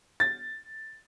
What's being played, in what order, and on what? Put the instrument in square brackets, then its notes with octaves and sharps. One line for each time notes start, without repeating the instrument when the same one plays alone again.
[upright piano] A6